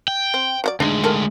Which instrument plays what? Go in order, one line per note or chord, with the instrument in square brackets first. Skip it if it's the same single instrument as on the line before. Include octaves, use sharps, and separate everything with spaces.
[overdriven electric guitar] G5
[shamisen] C4
F#3 F#4 D5
[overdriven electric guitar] D2 G#3 [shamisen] D4 D#4
[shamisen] D#3 A#3 A4